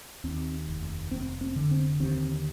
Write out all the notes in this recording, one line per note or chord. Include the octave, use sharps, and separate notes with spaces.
D#2 C4
F1
F1 C4
C4
D3
C4
D#2 C4